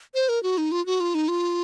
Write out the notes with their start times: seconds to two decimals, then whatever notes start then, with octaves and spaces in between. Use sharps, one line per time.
0.14 C5
0.29 A#4
0.43 F#4
0.58 D#4
0.72 F4
0.86 F#4
1.00 F4
1.15 D#4
1.28 F4